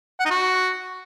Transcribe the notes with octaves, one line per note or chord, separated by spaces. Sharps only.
F#5
D#4
F#4